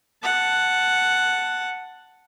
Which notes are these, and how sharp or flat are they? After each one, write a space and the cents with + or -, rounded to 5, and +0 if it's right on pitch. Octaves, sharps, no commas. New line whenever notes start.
F#5 +0 A5 +5